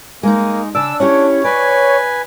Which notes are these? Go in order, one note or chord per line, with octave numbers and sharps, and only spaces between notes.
G#3 A#3 D#4
C#3 D4 D5 E6
C#4 E4 G4 C#5
B4 D5 G#5